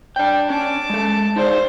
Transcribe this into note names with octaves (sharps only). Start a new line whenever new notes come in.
D4 D5 G5
C#4 A5 D6
G#3 A4
D#4 G#4 C5 D5